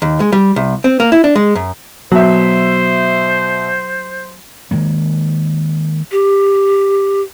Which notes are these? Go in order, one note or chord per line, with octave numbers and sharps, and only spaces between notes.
D#2
G#3
G3
C2
C4
A#3
E4
D4
G#3
F#2
B2 F#3 C5 E5
D#3 F3 G#3 A#3
G4